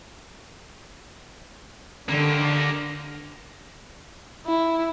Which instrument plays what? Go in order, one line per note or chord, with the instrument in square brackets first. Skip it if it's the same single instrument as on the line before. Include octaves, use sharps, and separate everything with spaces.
[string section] D3 [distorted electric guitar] A#3 G4
[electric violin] E4